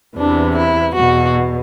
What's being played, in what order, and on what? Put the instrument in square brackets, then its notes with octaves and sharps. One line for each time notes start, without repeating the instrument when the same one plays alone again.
[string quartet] E2 C3 E3 D4
E4
E2 B2 F#4